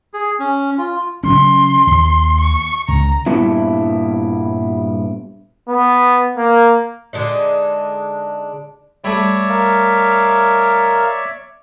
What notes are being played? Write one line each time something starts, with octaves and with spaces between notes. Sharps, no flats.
G#4
C#4
F4
C#3 F#3 C#4 C6
D#2
C#6
C#2 A#5
G2 A#2 G3 B3 D4 E4
B3
A#3
D3 G#3 D4 D#4
G3 A3 C#5 D5 E5
A#4 F5